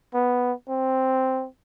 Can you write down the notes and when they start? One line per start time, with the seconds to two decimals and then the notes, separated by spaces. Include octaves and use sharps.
0.14 B3
0.69 C4